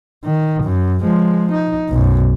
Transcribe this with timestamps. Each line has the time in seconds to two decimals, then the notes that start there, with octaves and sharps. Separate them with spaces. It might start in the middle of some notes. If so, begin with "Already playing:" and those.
0.25 D#3
0.63 F#2
1.02 F3 G#3
1.52 D#4
1.89 B1 F#2